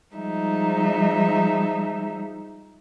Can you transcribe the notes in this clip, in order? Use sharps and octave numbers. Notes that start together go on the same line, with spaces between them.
F3 G3 G#3 D#4 E5